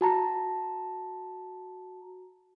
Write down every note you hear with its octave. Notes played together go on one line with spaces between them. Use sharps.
F#4 A5 A#5